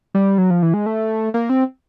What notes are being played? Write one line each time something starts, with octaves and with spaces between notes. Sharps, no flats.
G3
F#3
F3
E3
G#3
A3
A#3
C4